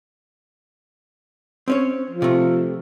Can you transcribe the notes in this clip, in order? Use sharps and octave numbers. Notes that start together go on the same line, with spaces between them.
C4 C#4 C#5
F3
C3 A3